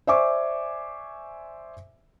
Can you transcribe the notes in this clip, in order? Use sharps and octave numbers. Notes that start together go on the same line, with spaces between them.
C5 D5 E5 G#5 C#6 D6